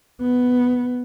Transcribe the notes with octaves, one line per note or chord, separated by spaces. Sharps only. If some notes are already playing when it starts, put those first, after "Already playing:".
B3